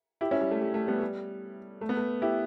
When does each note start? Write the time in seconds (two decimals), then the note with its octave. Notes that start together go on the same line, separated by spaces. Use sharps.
0.21 E4 G4
0.31 C#4 E4
0.41 G3
0.51 A3
0.61 G3
0.74 A3
0.87 G3 B3
1.01 G3
1.81 A3
1.89 B3
1.97 A3
2.22 E4 G4